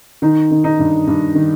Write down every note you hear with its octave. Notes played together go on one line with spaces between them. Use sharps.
D#3 D#4
D#3
D#4
G2
G2
D#3